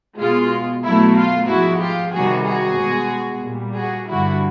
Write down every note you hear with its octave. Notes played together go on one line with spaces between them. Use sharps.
B2 G#3 F4
B2 F#3 A3 E4
F4
G#2 F3 G#3 E4 F#4
F4 G4
C3 D#3 G3 F#4 G#4
F#4 G#4
B2 G#3
A#2 G3
F#4 G#4
G2 D3 G3 E4 F#4